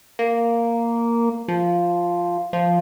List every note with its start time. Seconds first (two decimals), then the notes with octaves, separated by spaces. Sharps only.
0.19 A#3
1.48 F3
2.53 F3